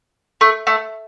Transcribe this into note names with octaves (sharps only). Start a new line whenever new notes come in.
A3
A3